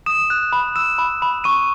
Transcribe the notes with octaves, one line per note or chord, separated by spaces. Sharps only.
D#6 E7
F#6
B5
E6 E7
B5
B5
C#6 D#7